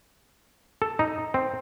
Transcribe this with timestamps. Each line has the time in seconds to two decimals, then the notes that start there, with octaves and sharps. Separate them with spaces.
0.82 A4
0.99 D#4
1.34 C4